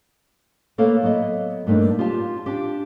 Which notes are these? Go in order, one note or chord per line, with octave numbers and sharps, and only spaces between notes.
A3 A#3 A4 B4 C#5 F5
F#3 B3 A4 D#5
G2 A3 A#3 D4 D#4
F4 G4 F5 A5
D4 G4